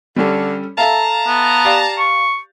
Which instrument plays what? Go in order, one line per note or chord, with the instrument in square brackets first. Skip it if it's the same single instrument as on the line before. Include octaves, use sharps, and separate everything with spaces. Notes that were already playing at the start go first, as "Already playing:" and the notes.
[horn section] D3 [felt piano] G3 C#4 A4
[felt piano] A4 E5 F5 [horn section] A5 A#5
[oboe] B3
[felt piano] G4 D5 F5
[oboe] C#6